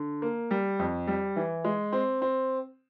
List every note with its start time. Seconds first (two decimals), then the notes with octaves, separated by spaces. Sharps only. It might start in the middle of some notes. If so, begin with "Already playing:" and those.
Already playing: D3
0.22 A#3
0.51 G3
0.79 F2
1.07 G3
1.36 E3
1.65 G#3
1.93 C4
2.22 C4